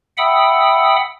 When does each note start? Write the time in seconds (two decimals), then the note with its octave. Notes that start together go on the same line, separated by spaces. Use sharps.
0.18 E5 F#5 G5 B5 D#6 E6